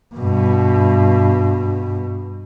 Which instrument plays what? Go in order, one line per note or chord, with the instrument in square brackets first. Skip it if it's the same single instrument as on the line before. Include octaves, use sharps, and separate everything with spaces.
[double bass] G2 B2